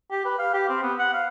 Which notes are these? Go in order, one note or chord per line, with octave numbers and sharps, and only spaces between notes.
G4
B4
F5
G4
C4
B3
F#5
F5